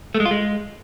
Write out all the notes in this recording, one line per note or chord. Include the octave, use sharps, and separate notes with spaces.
A3
G#3
F4
G#3